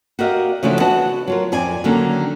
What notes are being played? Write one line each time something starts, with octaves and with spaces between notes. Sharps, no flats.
F#4 G4 A#4 D5 D#5 F5
C#3 E3 F3 A3 D4 F#4
B3 F#4 D#5 F#5 A5
F#3 F4 A#4
F2 C4 D5 G#5
D3 D#3 F#3 A#3 C#4 D4